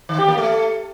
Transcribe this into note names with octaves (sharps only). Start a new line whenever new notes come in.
D#3
G4
A#3
A3